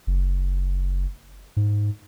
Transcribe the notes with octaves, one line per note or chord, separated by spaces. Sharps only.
F#1
G#2